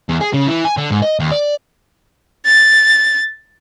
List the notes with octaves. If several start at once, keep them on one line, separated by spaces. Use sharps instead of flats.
E2
G#4
C#3
E3
G#5
D3
G#2
D#5
D#2
D5
A6